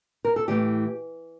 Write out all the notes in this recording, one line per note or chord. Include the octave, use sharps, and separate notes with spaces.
A#4
A4
A2 E3 A3 G4